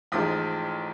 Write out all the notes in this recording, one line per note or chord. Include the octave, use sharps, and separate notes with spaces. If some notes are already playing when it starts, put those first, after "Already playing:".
A1 G#2 F3 G#3 D#6